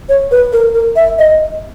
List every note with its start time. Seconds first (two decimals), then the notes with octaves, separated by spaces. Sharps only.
0.09 C#5
0.31 B4
0.53 A#4
0.74 A#4
0.96 E5
1.19 D#5